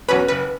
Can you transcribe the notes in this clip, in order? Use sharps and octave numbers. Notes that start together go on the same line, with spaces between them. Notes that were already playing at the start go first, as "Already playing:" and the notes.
E2 B2 F#3 C#4 B4
F#1 B4